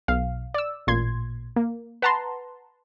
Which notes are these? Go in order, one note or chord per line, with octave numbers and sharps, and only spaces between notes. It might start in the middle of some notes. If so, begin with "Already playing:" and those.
B1 F5
D5 E6
A1 A#2 C6 G#6
A#3
B4 F#5 A5 A#5 C6